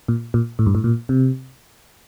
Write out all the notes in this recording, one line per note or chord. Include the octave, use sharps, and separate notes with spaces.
A#2
A#2
A2
G2
A2
A#2
C3